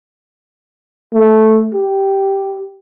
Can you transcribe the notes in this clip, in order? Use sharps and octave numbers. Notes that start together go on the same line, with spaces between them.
A3
G4